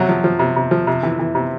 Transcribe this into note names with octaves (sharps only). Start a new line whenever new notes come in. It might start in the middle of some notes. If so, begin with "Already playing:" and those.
Already playing: C3 F#3
F3
F3
C3
C3
F3
C3
E3
E3
C3